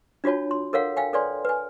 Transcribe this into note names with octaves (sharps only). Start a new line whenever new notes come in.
D4 F4 F#4 C#5 A5
C6
A4 A#4 C#5 F5 F#5
F5 G5 G#5
A4 B4 C#5 D5 G#5 C6
B4 G#5